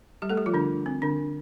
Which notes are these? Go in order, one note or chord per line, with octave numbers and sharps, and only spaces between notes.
G3 G4
A3 A4
G3 G4
F3 F4
D3 D4
C4
D3 D4